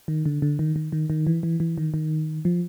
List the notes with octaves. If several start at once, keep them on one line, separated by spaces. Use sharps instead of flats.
D#3
D3
D3
D#3
D#3
D#3
D#3
E3
E3
E3
D#3
D#3
F3